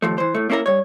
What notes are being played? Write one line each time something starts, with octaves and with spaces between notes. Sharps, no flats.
D#2 F3 A3
E3 C5
A2 A3
A#3 C#4 E4 A4 A#4
G2 C#5